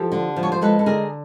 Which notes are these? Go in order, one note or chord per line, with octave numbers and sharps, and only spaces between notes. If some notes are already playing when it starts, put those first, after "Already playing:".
Already playing: F3 G4 A4
D3
F3
C#5
C5
G#3 A4 B4
A4
D3 G#4 A#4